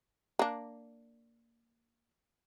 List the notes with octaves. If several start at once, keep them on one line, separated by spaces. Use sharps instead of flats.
A#3 D4